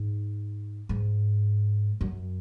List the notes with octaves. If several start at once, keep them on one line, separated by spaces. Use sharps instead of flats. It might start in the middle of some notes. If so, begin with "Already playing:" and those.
Already playing: G#2
G#2
F#2